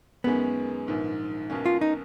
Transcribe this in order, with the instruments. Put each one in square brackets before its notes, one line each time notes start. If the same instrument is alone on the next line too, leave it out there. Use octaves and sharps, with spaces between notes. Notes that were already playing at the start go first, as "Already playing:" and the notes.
[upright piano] F#2 D#3 G#3 C#4 [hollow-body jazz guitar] B3
[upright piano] A#1 G#2 D#3
B1 B2 A#3 C#4
[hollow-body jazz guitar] F4
D#4